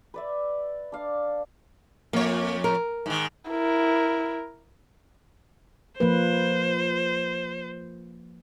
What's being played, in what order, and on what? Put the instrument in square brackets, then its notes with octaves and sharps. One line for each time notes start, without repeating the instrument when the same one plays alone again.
[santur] B4 D5 E5
D4 F5
[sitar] F2 C#5 [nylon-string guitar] A#3
[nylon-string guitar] A#4
[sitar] G#2 D#3
[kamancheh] E4 A#4
[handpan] F3 A#3 B4 [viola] C5